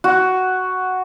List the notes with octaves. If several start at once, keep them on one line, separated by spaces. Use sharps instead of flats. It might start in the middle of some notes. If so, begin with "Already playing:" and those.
F#4